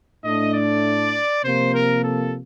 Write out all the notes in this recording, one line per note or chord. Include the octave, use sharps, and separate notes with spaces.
A2 A3 D4 D#5
D5
C3 F3 A#3 C5
A#4
A4